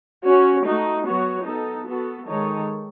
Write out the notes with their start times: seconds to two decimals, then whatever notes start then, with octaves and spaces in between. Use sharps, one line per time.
0.25 C#4 F#4 C#5
0.65 A3 D#4 F#4
1.05 F#3 B3 F#4 C#5
1.46 B3 D#4 A4
1.88 B3 F#4 A4
2.27 D#3 G#3 D#4 A4 C#5